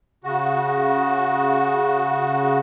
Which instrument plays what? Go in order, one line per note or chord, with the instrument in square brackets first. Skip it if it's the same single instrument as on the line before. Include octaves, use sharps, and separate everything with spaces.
[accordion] C#3 F#4